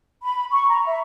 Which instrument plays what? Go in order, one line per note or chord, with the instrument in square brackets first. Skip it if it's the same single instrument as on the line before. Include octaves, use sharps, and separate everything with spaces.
[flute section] B5
C#6
A#5
E5